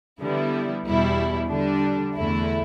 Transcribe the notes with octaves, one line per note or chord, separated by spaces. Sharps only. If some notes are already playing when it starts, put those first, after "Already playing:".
D3 G3 B3 E4
E2 B2 G3 E4
D3 G3 D4
E2 D3 A3 E4